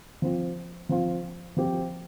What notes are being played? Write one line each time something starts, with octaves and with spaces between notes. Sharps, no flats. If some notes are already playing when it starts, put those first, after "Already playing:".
F3 C4 F4
F3 C4 F4
F3 C4 G4